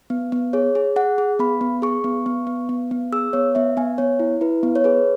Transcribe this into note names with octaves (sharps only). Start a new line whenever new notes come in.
B3
B3
G#4 C#5
G#4
G#4 F#5
G#4
B3 B5
B3
G#4 C#6
B3
B3
B3
B3
B3
G#4 E6
B3 C#5
B3 E5
B3 G#5
B3 C#5
E4
E4 B4
B3
C#5
G#4 B4